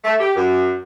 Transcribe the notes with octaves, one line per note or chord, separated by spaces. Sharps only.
A3
G4
F#2